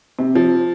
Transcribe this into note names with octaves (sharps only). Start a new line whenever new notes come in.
C3
F3